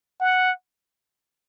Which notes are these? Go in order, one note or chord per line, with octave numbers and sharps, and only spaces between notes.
F#5